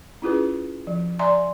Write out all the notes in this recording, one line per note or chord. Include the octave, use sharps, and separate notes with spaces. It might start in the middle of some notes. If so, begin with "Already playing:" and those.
C#4 E4 F4 G#4 B4
F3
D5 E5 G#5 A#5 C6